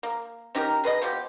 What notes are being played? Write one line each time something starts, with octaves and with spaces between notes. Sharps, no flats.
A#3
C#4 D#4 G4 A#4
G#4 B4 C5 D#5
B2 F3 G4